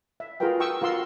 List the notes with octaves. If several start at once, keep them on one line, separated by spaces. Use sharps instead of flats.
E5
F4 F#4 G#4 A#4 B4 G5
G5 C#6 D#6 E6
F4 F#4 A#4 F#5 C6 E6